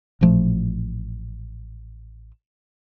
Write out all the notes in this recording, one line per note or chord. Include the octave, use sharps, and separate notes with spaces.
A1 A#2 F3 A3